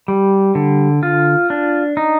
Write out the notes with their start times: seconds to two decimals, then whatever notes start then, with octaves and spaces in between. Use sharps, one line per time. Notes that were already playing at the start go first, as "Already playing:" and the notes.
0.08 G3
0.55 D3
1.03 F4
1.50 D4
1.97 D#4